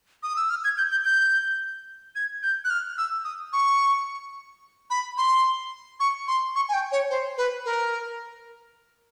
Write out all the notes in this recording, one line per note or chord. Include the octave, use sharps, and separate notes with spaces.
D#6
E6
F6
G#6
G6
G6
G6
G#6
G6
F#6
F6
E6
D#6
C#6
B5
C6
C#6
C6
C#6
G#5
G5
C#5
C5
B4
A#4